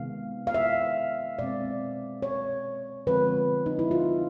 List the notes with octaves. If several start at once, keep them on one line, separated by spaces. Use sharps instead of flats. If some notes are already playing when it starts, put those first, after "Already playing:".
Already playing: C3 D#3 G#3 B3 F5
F5
E5
B2 G#3 C4 D5
C#5
D3 F3 G#3 C4 B4
D#4
E4
F4